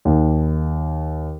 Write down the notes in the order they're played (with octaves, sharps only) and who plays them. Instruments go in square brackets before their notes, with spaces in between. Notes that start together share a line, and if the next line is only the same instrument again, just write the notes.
[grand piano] D#2